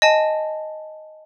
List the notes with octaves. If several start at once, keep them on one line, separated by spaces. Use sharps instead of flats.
D#5 G#5 A5